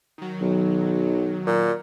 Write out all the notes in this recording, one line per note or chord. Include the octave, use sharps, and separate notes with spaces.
D#3 F#3
B1
A#2